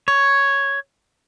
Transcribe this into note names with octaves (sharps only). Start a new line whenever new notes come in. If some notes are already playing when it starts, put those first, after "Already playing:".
C#5